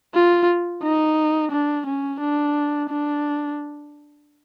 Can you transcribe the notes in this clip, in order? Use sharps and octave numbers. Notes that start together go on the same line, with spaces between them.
F4
D#4
D4
C#4
D4
D4